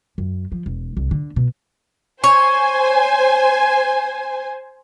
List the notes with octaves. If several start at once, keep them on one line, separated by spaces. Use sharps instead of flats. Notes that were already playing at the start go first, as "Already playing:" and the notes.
F#2
F3
E1
C2
D3
B2
C5 C#5 G#5